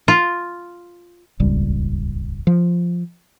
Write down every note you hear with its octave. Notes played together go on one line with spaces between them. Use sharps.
F4
D#1 G#1 C#2 G3
F3